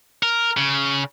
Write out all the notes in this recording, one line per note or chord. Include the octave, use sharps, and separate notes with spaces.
A#4
C#3